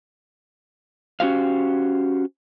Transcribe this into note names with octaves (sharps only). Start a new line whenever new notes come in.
C#4 F#4 G4 C5 F5